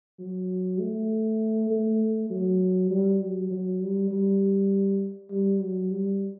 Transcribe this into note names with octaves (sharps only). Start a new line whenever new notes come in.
F#3
A3
A3
F#3
G3
F#3
F#3
G3
G3
G3
F#3
G3